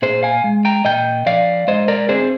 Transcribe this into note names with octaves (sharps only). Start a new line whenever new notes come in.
A#2 G#4 C5
F5 G#5
G#3
G5 A#5
A#2 D#5 G5
F3 D5 F5
G#3 C5 D#5
A#4 D5
C4 G#4 C5